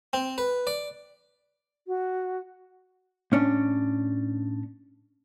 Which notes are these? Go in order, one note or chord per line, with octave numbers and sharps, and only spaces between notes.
C4
B4
D5
F#4
A2 C#4 D4